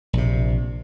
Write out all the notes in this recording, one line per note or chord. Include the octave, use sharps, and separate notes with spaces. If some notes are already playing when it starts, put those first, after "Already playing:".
A#1 C3